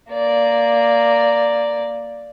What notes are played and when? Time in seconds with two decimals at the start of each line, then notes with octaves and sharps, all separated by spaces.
0.12 A#3 D5